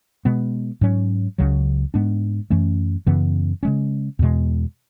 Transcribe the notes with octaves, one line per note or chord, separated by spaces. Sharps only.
B2 G#3 B3
G#2 F#3 C#4
C#2 C#3 F#3
G#2 G#3 B3 D4
F#2 E3 A3 C#4
F#2 C#3 E3 B3
C#3 G#3 C#4
E2 B2 G#3